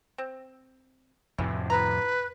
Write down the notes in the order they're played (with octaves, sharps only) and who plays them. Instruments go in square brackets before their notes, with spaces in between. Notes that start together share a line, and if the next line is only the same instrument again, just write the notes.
[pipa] C4
[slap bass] F2 A2 C3 [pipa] E3
[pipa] E4 A#5 [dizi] B4